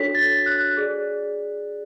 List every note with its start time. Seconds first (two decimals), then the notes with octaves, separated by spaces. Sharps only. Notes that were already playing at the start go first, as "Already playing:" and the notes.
Already playing: D4 F#4 A4 C#5 B6
0.15 A6
0.46 F#6
0.77 G#4 D5